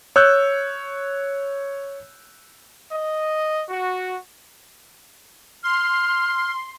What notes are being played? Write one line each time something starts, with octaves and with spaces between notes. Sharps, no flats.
C#5 E6 F#6 G6
D#5
F#4
C6 F6